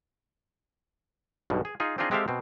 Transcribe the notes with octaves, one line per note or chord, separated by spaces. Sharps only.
B1 G2 B2
G#4
D#4 F4 G#4
C4 D4 D#4 F4 G#4 D#5
G#3 C4 G4 A4 E5 F5
B2 C4